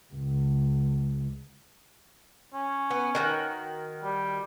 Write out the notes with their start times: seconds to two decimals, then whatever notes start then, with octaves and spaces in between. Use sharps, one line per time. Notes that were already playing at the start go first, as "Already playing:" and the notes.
0.13 C#2
2.54 C#4
2.91 B3
3.15 D#3 F#4 G5
4.03 G3